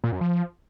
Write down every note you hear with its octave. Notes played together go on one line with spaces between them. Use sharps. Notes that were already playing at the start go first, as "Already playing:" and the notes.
A#2
F#2
F3